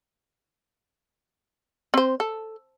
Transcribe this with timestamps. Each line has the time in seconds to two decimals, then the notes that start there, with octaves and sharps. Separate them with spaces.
1.94 C4 C5
2.20 A4